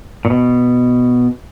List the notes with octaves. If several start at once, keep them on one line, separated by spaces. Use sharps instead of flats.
A#2
B2